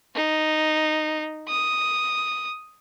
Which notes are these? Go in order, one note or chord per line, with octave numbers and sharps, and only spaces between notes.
D#4
D#6